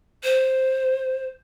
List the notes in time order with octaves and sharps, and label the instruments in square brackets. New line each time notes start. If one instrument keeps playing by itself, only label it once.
[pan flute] C5